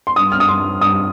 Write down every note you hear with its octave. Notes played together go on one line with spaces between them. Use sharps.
C6
G2 D#6
F6
G2 D#6
C6
G2
G2 D#6